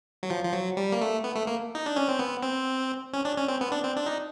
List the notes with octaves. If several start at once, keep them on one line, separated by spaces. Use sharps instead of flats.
F#3
F3
F3
F#3
G3
A#3
A3
B3
A3
A#3
D#4
D4
C#4
C4
B3
C4
C#4
D4
C#4
C4
B3
D4
C4
D4
D#4